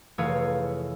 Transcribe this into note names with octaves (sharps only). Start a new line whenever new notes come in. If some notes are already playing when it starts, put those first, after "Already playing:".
F1 E3 A3 G#4 C#5 F5